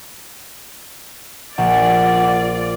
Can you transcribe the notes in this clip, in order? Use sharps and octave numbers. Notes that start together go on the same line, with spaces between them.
A#1 F4 D5 F#5